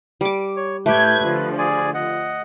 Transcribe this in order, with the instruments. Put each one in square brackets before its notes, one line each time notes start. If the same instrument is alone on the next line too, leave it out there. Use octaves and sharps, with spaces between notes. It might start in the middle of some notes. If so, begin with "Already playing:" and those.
[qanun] G3 D6
[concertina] C#5
[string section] A2 G6 G#6 [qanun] A3 G4 [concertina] B4
[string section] D3 F3
[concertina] G#4 D5 G#5
D#5 F#5